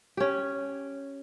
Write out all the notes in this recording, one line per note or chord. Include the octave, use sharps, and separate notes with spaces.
C#4 G4